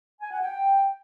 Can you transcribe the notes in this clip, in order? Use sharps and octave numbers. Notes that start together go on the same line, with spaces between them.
G#5
F#5
G5